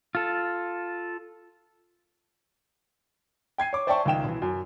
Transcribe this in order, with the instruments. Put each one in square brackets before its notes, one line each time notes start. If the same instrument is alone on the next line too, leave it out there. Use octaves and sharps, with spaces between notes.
[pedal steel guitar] F4 A4
[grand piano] G5 G#6 C7 D#7
C#5 D6
C5 D5 E5 G5 A5 C#6
C#2 D#3 G5 E7
B1 E3
F#2